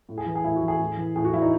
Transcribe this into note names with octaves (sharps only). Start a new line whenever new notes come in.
A2
G#4
E3
G#4
A2 E4
F#4
E3
G#4
A2
E3
A2 G#4
F#4
E3 E4
D#4